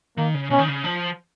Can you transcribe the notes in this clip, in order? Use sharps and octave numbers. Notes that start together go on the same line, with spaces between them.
D#3 A#3
C#3
B2 C#4
D#3
C#3
F3